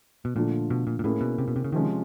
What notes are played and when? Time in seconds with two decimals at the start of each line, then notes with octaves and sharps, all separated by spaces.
0.25 B2
0.35 A#2 D3 F3 A3 D4 F4
0.70 B2
0.87 A#2
0.99 A#2
1.04 A2 A#3 C#4 E4 G#4
1.21 B2
1.38 C3
1.48 B2
1.56 C3
1.65 C#3
1.72 C3 D#3 F3 G#3 C#4